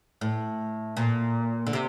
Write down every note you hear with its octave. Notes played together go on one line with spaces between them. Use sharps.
A2
A#2
D3
C3